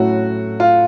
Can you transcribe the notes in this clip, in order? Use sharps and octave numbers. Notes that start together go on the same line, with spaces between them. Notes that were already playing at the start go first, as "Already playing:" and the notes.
Already playing: A2 F#3 A3 C#4 E4 F#4
F4